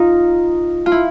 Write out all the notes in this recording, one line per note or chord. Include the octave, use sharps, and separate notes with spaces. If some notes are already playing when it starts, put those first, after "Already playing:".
Already playing: D#4 F4
F4
E4